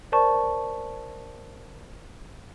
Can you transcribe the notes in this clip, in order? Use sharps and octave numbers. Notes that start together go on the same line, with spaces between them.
A#4 C5 D5 A5 C#6